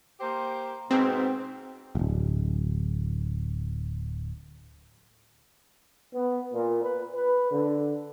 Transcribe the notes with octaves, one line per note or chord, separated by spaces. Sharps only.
A#3 G4 C5
G#2 B2 C4
D1 G#1
B3
A#2
B4
B4
D3